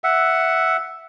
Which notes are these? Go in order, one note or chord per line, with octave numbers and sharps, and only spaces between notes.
E5 F#5